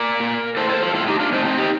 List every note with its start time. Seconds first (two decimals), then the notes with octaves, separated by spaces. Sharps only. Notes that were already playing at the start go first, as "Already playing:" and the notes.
Already playing: A#4 D5
0.20 A#2
0.57 A2 A4 C5
0.69 A4 C5
0.83 F4 A4
0.94 A2 F4 A4
1.07 D#4 G4
1.20 D4 F4
1.32 A2 C4 D#4
1.45 C4 D#4
1.57 D#4 G4